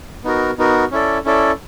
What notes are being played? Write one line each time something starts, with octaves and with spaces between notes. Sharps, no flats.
B3 D#4 F#4 A#4
B3 D#4 F#4 A#4
C#4 E4 A4 D5
C#4 E4 A4 D5